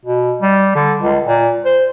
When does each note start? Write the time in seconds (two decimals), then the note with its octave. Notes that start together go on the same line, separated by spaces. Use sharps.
0.05 B2
0.42 G3
0.75 D3
1.02 C#2
1.26 A#2
1.65 C5